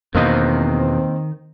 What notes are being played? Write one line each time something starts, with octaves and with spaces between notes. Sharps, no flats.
E2 B2 D#3 A#3 C4 C5 D#5